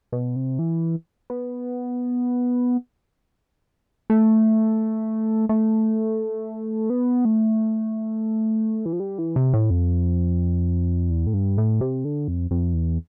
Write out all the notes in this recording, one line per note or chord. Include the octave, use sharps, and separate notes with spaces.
B2
C3
E3
B3
A3
A3
B3
A3
E3
F3
G3
E3
C3
A2
F2
E2
A2
G2
A2
C3
D3
F2
F2
E2